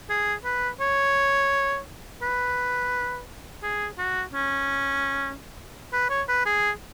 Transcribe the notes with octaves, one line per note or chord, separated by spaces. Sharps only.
G#4
B4
C#5
B4
G#4
F#4
C#4
B4
C#5
B4
G#4